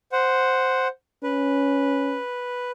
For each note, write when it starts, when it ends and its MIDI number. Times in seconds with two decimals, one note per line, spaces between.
0.12 0.88 72
0.12 0.88 78
1.23 2.19 61
1.23 2.71 71